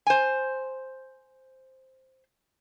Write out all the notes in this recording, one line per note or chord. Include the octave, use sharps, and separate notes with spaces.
C5 G#5